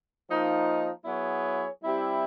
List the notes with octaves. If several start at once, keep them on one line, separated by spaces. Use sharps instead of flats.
F3 A#3 D#4
F#3 B3 E4 G#4 C#5
G3 C4 E4 G4